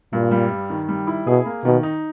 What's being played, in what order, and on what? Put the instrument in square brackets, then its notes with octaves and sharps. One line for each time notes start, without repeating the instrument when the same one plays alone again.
[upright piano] G2 [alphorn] A#2
[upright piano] G3
G2
D#3
G3
E4
[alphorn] B2 [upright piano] G#4
[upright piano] A#3
[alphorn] B2 [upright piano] D#3
[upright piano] D#4